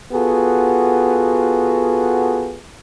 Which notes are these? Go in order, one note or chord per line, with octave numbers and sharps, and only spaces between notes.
B3 F4 F#4 G#4 A4